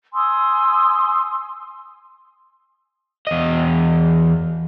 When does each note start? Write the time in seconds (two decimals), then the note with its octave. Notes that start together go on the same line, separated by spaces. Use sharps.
0.13 G#5 C6 D#6 E6
3.27 E2 D#5